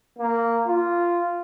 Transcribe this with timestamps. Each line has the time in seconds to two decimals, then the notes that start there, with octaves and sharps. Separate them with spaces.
0.19 A#3
0.67 F4